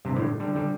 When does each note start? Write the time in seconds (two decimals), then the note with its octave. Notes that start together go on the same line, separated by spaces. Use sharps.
0.05 G2 C3
0.16 A2 D3
0.40 D3 G3
0.55 D3 G3